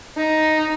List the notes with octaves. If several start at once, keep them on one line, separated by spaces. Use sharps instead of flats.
D#4